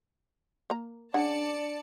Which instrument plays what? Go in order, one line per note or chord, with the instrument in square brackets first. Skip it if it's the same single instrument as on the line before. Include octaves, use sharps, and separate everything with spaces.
[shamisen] A#3 A#5
[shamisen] C#3 F#5 [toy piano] D4 [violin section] D5 A5 C#7